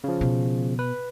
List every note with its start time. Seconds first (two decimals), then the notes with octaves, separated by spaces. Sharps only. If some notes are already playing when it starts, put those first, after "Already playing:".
0.04 C#3 F3
0.21 B2
0.79 B4